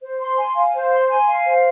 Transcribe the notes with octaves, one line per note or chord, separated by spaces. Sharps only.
C5
C6
G#5
F5
C5
C6
G#5
F5
C5